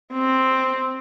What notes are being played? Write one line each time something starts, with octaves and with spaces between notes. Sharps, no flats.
C4